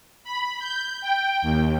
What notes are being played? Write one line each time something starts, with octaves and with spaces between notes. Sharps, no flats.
B5
G6
G5
D#2